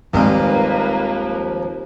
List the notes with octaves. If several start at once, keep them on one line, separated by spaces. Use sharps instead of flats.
D#2 D#3 F3 G3 G#3 A#3 C4 B4